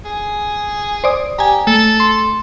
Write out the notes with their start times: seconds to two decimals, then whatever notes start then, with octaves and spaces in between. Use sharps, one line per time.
0.05 G#4
1.04 C5 D5 D#6
1.38 G4 G#5 A#5
1.67 A3 A4
2.00 C6